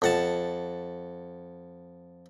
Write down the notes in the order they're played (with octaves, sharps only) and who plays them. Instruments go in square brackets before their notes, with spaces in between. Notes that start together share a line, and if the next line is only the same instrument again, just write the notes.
[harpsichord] F2 F#5 A5